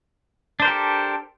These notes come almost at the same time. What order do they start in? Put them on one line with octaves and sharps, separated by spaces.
D4 C5 A#4 G4 A4